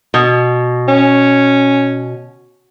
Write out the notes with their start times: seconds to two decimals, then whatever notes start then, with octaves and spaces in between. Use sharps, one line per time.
0.14 B2
0.88 C#4